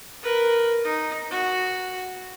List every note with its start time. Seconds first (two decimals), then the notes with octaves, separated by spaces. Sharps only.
0.22 A#4 B4
0.84 D#4
1.30 F#4